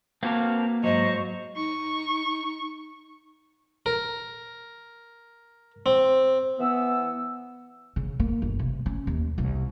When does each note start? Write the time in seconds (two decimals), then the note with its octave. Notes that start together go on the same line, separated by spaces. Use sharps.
0.23 A#3 C4 F#4 A#4 B4 F5 A5
0.84 G#2 F#3 C5 D#5 C#6
1.56 D#4 C#6
3.86 A#4
5.86 C4
6.59 E3 B3 E6
7.96 C#3
8.20 A#3
8.42 G1
8.59 C3
8.86 C#4
9.07 D#2
9.38 C2